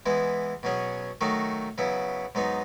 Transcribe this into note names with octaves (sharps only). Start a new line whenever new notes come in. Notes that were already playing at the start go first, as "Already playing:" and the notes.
E3 G#3 B3 E4
B2 F#3 C#4 G#4
D#3 F#3 A3 D#4 F#4
C#3 F#3 B3 E4
G#2 F#3 B3 D#4